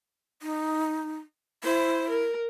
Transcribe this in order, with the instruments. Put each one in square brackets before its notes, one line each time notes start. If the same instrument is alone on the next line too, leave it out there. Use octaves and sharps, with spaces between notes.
[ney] D#4
[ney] E4 [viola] C5
[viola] A#4